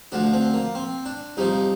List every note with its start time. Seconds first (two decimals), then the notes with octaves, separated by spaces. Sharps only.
0.12 D2 D3 F3 D4
0.33 C4
0.54 A#3
0.75 C4
1.05 D4
1.37 C2 C3 F3 D#4